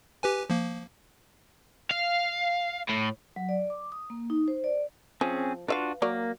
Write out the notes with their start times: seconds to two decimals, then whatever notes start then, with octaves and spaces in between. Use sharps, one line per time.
0.23 G4 B4 G#5
0.50 F3 A#3
1.91 F5
2.89 A2
3.36 F#3
3.49 D5
3.70 D6
3.92 D#6
4.10 A#3
4.30 D#4
4.48 C5
4.64 D5
5.21 F3 C4 C#4 G#4
5.68 D4 F4 F#4 B4 E5 F5
6.02 F#3 A#3 A#4 D5